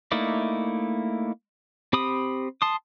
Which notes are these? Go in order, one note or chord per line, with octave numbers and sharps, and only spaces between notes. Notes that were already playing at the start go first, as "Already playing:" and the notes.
A3 A#3 D#4 E4 D5
C4 G4 B5 D#6
A5 C6 D#6